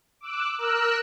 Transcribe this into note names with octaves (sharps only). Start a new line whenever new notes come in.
D6 E6 F#6
A#4 E6 F#6